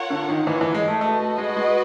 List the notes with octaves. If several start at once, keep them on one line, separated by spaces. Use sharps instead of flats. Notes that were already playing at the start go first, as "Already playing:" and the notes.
Already playing: F4 A#4 C#5 F#5
D3
D#3
E3
E3
G#3
A3
A3 F#4 B4 D#5
A3
G#3
G#3